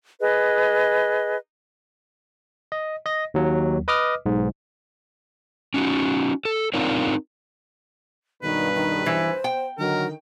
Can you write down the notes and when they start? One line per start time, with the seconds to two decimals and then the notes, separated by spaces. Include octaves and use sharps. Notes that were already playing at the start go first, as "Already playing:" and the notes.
0.20 G#4 B4 D#5
2.72 D#5
3.06 D#5 A#6
3.34 D#2 F#3
3.88 B4 D#5 D6 D#6 F6
4.26 B1 G#2
5.74 C#4 D#4 F#4
6.45 A4
6.74 C4 D4 D#4 F4 A#4 C#5
8.43 B1 G2 D#3 B4
8.75 D#3
9.06 E3 C5
9.44 G5
9.79 D3 D#3 F#3 A#4